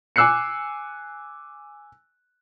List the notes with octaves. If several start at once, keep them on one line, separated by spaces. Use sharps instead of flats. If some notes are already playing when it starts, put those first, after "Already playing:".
G#5 D6 E6 F#6 C7 C#7